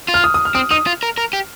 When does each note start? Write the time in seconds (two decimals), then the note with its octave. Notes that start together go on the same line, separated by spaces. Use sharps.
0.08 F4
0.14 F6
0.24 D#6
0.34 D#6
0.45 F6
0.55 C4 D#6
0.71 D#4 D#6
0.86 F4
1.03 A#4
1.18 A#4
1.33 G4